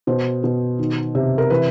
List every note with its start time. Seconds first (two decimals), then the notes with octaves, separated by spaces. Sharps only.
0.07 B2 C5
0.44 B2
0.79 D#3
1.15 C3
1.38 A#4
1.50 E3 B4